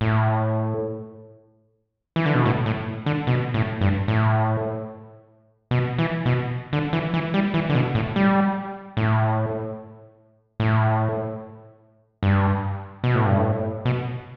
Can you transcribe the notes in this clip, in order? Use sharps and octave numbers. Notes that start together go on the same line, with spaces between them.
A2
E3
D3
B2
A2
A2
D3
B2
A2
G2
A2
B2
E3
B2
D3
E3
E3
G3
E3
D3
B2
A2
G3
A2
A2
G2
B2
A2
G2
A2
B2